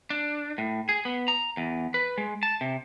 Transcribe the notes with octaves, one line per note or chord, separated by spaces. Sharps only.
D4
A2
G#4
B3
A#5
E2
B4
G#3
A5
C3